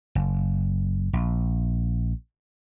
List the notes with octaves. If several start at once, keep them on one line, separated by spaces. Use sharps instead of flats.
F#1
A#1